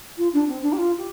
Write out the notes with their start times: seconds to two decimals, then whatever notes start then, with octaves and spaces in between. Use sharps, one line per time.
0.17 F4
0.33 D4
0.48 C4
0.62 D4
0.72 G4
0.77 F4
0.97 G4